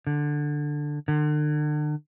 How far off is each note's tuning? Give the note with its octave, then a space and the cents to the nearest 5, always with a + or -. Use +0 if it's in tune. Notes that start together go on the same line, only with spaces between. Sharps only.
D3 +10
D3 +40